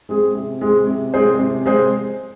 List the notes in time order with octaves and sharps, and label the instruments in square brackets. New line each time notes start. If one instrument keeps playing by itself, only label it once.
[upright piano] G#3 C4 G#4
C3
G#3 C4 G#4
C3
G#3 C4 G#4 C5
C3
G#3 C4 G#4 C5